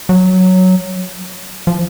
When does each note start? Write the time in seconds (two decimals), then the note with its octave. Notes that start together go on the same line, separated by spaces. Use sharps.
0.09 F#3
1.67 F3